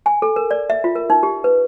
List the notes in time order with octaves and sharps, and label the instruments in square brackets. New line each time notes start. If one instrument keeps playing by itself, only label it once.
[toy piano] G#5
A4
A#4
D5
E5
F4
A#4
D#4
G4
B4